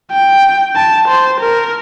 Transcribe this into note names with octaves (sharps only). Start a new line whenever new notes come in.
G5
A5
C5
A#4